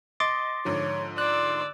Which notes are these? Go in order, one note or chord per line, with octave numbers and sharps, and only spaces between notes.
D#5 C6 D6 A6
G#2 D3 F3 C#5
D5 C6 E6 F#6